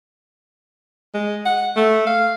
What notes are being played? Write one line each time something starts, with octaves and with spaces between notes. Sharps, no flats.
G#3
F#5
A3
F5